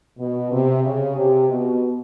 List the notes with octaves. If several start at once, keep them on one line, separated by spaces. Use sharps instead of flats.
B2
C3
C#3
C3
B2